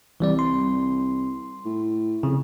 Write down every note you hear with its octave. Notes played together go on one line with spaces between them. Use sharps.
C2 E3 G3 D5
C6
A2
F2 C#3